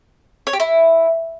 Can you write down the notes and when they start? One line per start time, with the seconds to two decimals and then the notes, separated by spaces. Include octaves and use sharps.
0.47 C#5
0.53 G4
0.60 E4